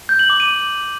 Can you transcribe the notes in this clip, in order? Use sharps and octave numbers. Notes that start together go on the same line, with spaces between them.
G6
F#7
D6
D#7